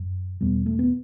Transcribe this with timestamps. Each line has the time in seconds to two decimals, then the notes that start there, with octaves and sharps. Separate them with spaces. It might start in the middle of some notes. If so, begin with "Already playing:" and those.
Already playing: F#2
0.41 E2 B2 G3 B3
0.66 A3
0.79 B3